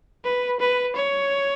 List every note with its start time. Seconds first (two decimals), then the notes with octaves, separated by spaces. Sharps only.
0.24 B4
0.60 B4
0.96 C#5